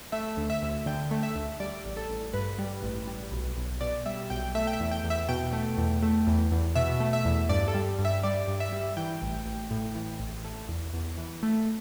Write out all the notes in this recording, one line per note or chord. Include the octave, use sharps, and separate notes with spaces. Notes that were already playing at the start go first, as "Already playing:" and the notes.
A3 E5
D2
E5
D2
D3 G5
A3
E5
D2
G3 D5
A1
A4
A1
G2 B4
G3
A1
G3
B1
B1
B2 D5
G3 E5
B1 G5
A3 E5
G5
E5
E2
G5
E2
E5
B2 G5
A3
E2
A3
E2
E2
B2 E5
A3
E5
E2
G2 D5
A4
G3
G2
E5
G3 D5
G2
E5
G3
E3 G5
A1
A1
A2
E3
A1
A3
E2
E2
E3
A3